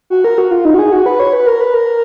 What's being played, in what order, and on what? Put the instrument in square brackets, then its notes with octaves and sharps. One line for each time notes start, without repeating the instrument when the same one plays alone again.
[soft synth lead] F#4
A#4
F#4
F4
D#4
F#4
G#4
F#4
B4
C#5
B4
A#4
B4
A#4